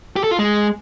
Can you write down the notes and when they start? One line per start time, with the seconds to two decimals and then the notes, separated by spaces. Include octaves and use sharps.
0.16 G4
0.24 A4
0.31 F4
0.39 G#3